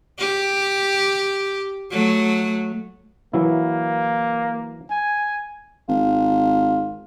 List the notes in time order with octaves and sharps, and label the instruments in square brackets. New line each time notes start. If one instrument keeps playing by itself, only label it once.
[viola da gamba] G4
F#3 A3
[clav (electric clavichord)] E3 F#3 E4 [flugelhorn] A#3
[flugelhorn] G#5
[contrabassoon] G#1 [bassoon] F4